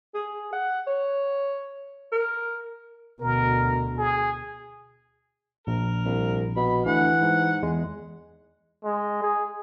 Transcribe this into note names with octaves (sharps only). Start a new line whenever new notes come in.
G#4
F#5
C#5
A#4
D2 B2 A#4
G#4
A#1 A#4
C2
B2 B5
D2 E3 F#5
G#2
E2 G#3
G#3
G#4